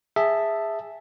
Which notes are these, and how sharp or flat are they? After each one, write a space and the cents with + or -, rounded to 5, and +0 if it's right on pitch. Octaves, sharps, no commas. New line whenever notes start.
G#4 -15 E5 +0 A5 +0